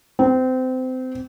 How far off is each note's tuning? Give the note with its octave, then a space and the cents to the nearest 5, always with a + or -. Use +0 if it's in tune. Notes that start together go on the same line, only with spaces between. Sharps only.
C4 -25